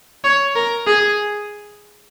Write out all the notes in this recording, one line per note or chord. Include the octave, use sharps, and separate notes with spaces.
C#5
A#4
G#4